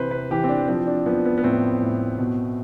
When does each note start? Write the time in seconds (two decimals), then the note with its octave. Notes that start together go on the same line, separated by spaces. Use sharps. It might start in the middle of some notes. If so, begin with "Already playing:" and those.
Already playing: C3 E3 B4 C5
0.11 B4
0.30 E3 G4
0.44 C4
0.49 D4
0.68 F3 C4
0.87 D4
1.06 F3 B3
1.25 B3
1.38 B3
1.43 A2 C4
1.82 A2
2.19 B2